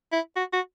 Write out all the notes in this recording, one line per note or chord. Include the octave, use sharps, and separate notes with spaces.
E4
F#4
F#4